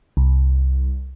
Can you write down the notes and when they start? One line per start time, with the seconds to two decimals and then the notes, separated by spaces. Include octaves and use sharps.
0.17 C2